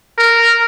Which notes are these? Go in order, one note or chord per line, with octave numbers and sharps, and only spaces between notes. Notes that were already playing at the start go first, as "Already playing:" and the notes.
A#4